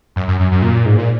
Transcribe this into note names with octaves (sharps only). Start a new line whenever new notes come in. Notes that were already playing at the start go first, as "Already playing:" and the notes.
F#2
F#2
F#2
F#2
A#2
G#2
A#2